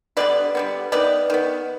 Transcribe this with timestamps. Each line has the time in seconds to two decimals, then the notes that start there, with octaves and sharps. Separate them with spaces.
0.17 D3 G3 B3 B4 D5
0.55 D3 G3 B3
0.92 D#3 B3 B4 D5
1.30 D#3 B3